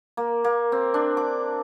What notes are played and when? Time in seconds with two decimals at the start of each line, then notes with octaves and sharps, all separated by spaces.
0.17 A#3
0.44 A#3
0.72 C4
0.94 D4
1.17 D6